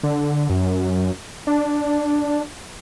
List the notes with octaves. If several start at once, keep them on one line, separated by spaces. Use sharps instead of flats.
D3
F#2
D4